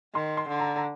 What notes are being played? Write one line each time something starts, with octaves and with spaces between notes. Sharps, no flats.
D#3 C6
C6
D3
A#5
A#5